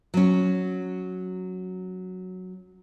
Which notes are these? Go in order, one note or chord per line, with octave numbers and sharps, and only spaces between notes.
F#3 C#4